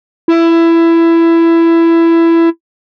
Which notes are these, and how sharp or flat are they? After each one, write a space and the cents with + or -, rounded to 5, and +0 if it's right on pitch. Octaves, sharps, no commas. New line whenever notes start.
E4 +15